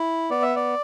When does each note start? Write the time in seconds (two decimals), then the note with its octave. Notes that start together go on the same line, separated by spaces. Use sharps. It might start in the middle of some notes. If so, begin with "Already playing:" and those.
Already playing: E4
0.30 B3 D5
0.42 E5
0.56 D5